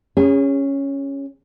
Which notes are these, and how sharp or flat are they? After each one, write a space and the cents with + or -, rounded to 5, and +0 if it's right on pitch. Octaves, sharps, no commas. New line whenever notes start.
C#4 +0 G#4 -35